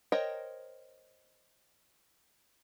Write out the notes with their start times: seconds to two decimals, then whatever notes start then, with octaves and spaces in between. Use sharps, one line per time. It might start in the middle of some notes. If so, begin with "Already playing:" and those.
0.12 A#4 C5 C#5 D#5 G5